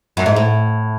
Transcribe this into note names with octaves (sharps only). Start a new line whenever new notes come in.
F#2
G#2
A2